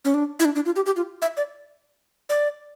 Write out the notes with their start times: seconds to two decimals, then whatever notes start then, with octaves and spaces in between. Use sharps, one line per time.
0.05 C#4
0.14 D4
0.40 E4
0.45 D4
0.55 D4
0.66 F4
0.76 G4
0.86 G4
0.96 F4
1.22 E5
1.37 D5
2.29 D5